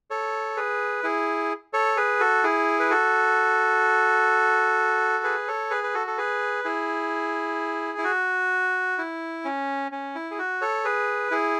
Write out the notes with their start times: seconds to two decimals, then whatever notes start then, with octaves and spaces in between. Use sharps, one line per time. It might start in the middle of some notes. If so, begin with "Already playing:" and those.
0.10 A4 C#5
0.57 G#4 B4
1.03 E4 G#4
1.73 A4 C#5
1.97 G#4 B4
2.20 F#4 A4
2.44 E4 G#4
2.79 B4
2.90 F#4 A4
5.24 G#4 B4
5.48 A4 C#5
5.71 G#4 B4
5.83 B4
5.94 F#4 A4
6.07 A4
6.18 G#4 B4
6.64 E4 G#4
7.98 E4
8.04 F#4
8.98 E4
9.45 C#4
9.92 C#4
10.15 E4
10.31 G#4
10.39 F#4
10.61 A4 C#5
10.85 G#4 B4
11.31 E4 G#4